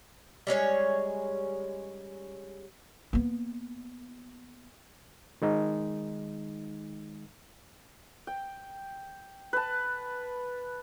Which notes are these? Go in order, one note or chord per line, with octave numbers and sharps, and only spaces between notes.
G3 G#3 C#4 C#5
A#3 B3
D#3 G#3 D#4
G5
B4 A5